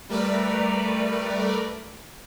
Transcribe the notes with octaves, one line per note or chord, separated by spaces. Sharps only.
G3 A3 A#4 B4 D5